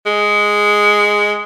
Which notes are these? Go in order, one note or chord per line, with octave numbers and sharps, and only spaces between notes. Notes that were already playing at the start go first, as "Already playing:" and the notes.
G#3